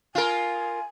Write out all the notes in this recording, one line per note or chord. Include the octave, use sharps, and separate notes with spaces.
F4 A#4 G#5